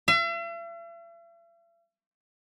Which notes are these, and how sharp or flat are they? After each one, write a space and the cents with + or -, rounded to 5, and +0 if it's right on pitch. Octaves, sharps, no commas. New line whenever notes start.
E5 +45